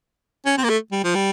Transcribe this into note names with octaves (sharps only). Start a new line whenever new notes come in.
C#4
C4
A#3
A3
G3
F3
G3